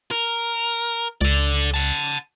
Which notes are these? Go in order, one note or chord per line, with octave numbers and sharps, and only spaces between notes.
A#4
C#2 A4 D5
F#5 A5